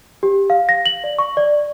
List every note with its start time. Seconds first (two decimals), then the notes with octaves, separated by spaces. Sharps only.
0.23 G4
0.50 F5
0.69 A#6
0.86 F#7
1.04 D5
1.19 C#6
1.37 D5